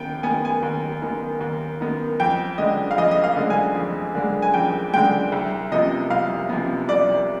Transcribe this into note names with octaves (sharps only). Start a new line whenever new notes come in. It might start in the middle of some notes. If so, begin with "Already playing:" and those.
Already playing: D#2 B3 G5
D#3 B3 G#5
G#5
D#2
D#3 B3
D#2
D#3 B3
F2 G5
D3 G#3 D#5
F5
F2 D#5
D#5
F5
D3 G#3
G#5
F2
D3 G#3
G#5
F2 G5
D3 G#3 G5
C2
C3 F3 B3 D#5
C2 F5
C3 F3 B3
C2 D5